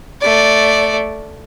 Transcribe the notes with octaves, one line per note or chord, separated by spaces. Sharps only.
A3 D5